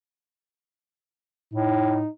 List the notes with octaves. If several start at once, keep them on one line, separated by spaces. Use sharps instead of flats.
A2 D#4